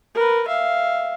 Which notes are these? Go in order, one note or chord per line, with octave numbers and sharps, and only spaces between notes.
A#4 B4
E5 F5